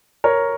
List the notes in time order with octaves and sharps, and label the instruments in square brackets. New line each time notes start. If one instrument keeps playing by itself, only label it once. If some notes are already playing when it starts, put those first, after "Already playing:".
[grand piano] A#4 C#5